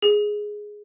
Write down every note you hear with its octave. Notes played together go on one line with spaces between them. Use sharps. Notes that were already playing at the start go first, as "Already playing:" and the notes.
G#4